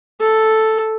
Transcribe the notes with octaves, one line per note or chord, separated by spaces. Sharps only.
A4